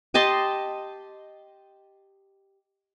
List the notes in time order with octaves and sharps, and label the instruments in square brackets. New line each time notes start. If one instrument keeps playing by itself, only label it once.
[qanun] G4 D#5 A5 C6